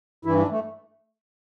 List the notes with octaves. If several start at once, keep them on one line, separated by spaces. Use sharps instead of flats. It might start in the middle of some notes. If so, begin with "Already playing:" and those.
G2 E3 E4
D4
A3